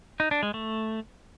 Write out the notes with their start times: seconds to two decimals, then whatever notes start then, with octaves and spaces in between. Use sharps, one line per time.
0.20 D#4
0.31 D4
0.43 G#3
0.54 A3